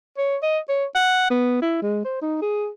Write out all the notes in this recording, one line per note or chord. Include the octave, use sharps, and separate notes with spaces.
C#5
D#5
C#5
F#5
B3
E4
G#3
C5
D#4
G#4